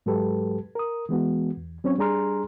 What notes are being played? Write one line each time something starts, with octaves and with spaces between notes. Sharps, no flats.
G#2 F#3 G#3 G4 A4 B4
A#4 D#6
E3 G#3 B3 F#4
E2
F#3 C4 C#4 C#5
G3 D4 G#4 A#5 C6 F6